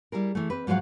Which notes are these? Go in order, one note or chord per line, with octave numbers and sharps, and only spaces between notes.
G3 E4 G#4 A#4
E3 A3
C4 B4
G#2 F3 F#3 C5 F5 F#5